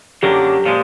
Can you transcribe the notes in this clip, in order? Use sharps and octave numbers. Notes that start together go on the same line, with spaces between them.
F#2 D3 F#3 A#3 D4 G4
A#2 F3 G#3